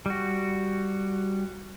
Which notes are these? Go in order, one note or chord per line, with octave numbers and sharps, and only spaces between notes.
G3 F#4